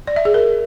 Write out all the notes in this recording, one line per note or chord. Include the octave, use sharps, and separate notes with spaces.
D5
E5
G#4
A#4